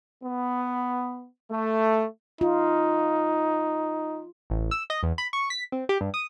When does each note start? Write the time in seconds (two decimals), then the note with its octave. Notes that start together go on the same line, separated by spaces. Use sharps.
0.24 B3
1.51 A3
2.41 D#4 F4
4.50 A1
4.71 E6
4.90 D#5
5.03 E2
5.18 B5
5.33 C#6
5.50 B6
5.72 C4
5.89 G4
6.01 G2
6.14 D#6